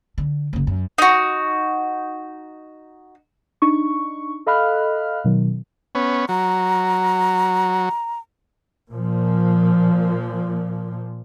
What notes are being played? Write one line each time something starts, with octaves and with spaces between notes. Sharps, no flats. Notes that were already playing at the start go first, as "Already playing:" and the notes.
D3
F#1 C#3
F#2
D#4 F#4
D4 D#4 C#6
A4 D#5 F5 B5 F6 F#6
B2 D#3 F#3
B3 C#4
F#3 A#5
A#2 F3